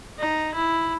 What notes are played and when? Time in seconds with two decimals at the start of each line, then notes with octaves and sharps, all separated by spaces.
0.20 D#4
0.54 E4